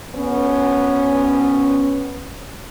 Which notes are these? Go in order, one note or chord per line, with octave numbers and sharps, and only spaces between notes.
D2 B3 C#4